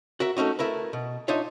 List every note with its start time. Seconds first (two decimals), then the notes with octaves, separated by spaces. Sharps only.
0.20 F#4 A#4 E5
0.37 A3 C#4 D#4 F#4
0.59 A3 E4 A#4 B4
0.93 B2
1.28 D4 D#4 F4 C#5 E5